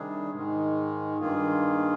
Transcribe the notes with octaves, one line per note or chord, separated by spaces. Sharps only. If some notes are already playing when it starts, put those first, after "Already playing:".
Already playing: C3 D#3 G3 D4 G#4
G#2 D#3 G#3
G2 D#3 A#3 F4 G#4